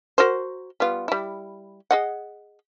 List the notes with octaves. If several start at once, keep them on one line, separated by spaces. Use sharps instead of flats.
F#4 A#4 C5
G3 B3 F4
G3 E4
G#4 D#5 F#5